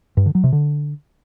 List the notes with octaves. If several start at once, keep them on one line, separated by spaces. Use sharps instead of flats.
G2
D3
F#3
C3
D3